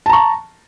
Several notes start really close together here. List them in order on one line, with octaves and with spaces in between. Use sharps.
A5 A#5 C#6